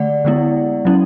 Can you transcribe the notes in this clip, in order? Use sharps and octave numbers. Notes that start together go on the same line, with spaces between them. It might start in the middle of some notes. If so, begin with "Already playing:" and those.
Already playing: D3 A3 D5 F#5
D3 G#3 B3 E4
F#3 C#4 E4